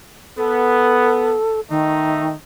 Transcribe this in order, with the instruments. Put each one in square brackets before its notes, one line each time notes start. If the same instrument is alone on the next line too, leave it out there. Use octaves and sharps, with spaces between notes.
[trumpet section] B3 [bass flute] A4
[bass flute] D#3 [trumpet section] A3 D#4 E5